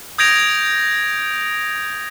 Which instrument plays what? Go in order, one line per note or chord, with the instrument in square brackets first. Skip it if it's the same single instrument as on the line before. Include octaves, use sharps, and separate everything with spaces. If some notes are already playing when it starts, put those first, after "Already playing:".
[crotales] D#6 G6 G#6 A#6 D7 F7